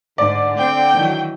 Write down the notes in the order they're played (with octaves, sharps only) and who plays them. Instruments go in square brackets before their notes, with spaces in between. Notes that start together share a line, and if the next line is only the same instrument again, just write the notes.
[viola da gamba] G#2 [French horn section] D3 [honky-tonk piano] D5
[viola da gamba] C4 [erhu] G5
[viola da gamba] D#3 E3 F#3